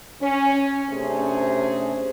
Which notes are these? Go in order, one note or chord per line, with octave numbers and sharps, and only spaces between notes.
C#4
C3 A3 C#4 D4 G#4 C5